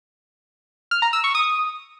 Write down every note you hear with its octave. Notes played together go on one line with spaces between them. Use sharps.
F6
A#5
E6
C#6
D#6